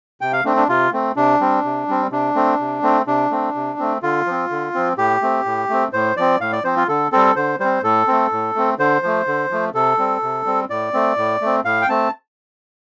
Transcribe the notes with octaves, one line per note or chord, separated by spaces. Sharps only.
C3 G5
F5
A3 C4 D4
D4
C3 F4
A3 C4
C3 D4
G3 C4
C3
G3 C4
C3 D4
A3 C4
C3
A3 C4
C3 D4
A3 C4
C3
A3 C4
D3 F4
F3 C4
D3
F3 C4
A2 G4
A3 C4
A2
A3 C4
A2 C5
F3 C4 D5
A2 F5
D5
F3 C4 C5
F4
D3 A4
G3 C4 A4
D3 C5
G3 C4 C5
A2 A4
A3 C4
A2
A3 C4
D3 C5
F3 A3
D3
F3 A3
C3 A4
G3 C4
C3
G3 C4
A2 D5
A3 C4
A2
A3 C4
A2 F5
G5
A3 C4 A5